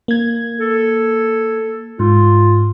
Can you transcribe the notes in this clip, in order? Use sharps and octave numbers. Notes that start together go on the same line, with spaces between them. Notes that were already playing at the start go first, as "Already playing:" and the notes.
A#3 G#6
A4
G#2 F4